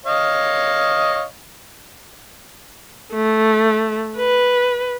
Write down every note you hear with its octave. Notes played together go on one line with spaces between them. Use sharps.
C#5 D#5 F5
A3
B4